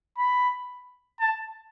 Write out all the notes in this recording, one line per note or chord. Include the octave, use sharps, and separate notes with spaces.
B5
A5